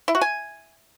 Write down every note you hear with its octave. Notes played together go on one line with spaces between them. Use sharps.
E4
F#4
G#5